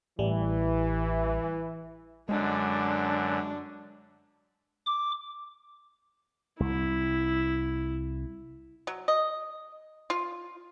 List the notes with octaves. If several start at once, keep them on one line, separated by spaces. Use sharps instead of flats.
A1 E3 G3
F#2 D3 G#3 D4
D6
C2 E4
F#3
D#5
F4